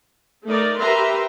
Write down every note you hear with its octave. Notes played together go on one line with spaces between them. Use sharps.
A3 D#4 A#4 D5
G4 A#4 B4 E5 A#5 C6